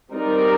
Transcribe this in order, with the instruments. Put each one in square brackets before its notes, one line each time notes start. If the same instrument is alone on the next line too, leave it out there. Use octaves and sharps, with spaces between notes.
[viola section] G3 C4 D#4 A#4 D5